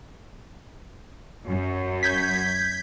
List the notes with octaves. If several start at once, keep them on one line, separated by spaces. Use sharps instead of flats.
F#2
G6 G#6 B6